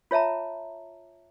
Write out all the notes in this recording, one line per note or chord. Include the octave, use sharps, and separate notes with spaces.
F4 C#5 E5 A5 A#5